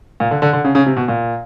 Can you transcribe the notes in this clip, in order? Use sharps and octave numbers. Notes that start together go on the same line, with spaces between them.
A#2
D3
D3
D3
C#3
C#3
C3
B2
A#2